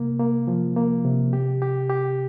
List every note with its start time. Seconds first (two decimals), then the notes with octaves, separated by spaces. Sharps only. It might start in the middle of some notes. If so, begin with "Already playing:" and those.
Already playing: C3 A#3
0.20 A#3
0.48 F3
0.76 A#3
1.05 C3
1.33 G4
1.62 G4
1.90 G4